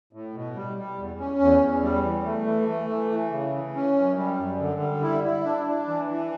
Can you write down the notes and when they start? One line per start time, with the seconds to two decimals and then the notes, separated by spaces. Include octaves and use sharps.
0.13 A2
0.34 B2
0.56 G3
0.77 G3
0.98 E2
1.19 C#4
1.41 E2
1.62 E2
1.83 G3
2.04 E3
2.25 A3
2.47 E3
2.68 A3
2.90 E3
3.11 E3
3.32 C#3
3.53 E3
3.75 C#4
3.96 F#2
4.17 G3
4.38 F#2
4.59 D3
4.80 G3
5.02 E4
5.24 E4
5.45 D4
5.67 D4
5.88 E3
6.09 E3